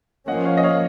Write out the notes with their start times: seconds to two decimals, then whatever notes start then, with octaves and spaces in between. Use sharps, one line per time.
0.28 F3 A#3 C#4 D#5 F#5
0.45 C#5 F5
0.57 D#5
0.64 C#5 F5